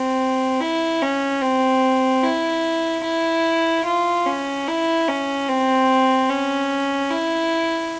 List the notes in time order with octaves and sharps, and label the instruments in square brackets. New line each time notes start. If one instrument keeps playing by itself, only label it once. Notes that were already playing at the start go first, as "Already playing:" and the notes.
Already playing: [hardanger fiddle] C4
E4
C#4
C4
E4
E4
F4
C#4
E4
C#4
C4
C#4
E4